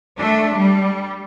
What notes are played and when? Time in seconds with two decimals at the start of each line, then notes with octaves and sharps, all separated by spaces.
0.17 A3 D4
0.53 G3